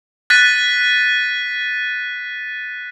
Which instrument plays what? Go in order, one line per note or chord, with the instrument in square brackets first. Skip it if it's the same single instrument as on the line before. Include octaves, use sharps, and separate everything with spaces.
[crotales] F#6 A6 B6 D#7